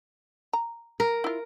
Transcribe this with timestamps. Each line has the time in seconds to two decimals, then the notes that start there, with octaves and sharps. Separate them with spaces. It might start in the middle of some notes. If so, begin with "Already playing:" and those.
0.53 A#5
1.00 A#4
1.24 E4 F4